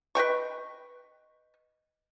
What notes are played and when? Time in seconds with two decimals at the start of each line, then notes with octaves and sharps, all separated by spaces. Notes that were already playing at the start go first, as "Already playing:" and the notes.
0.15 B4 D#5 G5 C#6